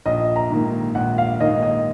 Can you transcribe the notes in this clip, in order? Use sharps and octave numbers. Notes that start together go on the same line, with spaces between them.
A#1 D#5
A#5
G#2 D#3 A#3
A#1 F#5
F5
G#2 D#3 A#3 D#5
D#5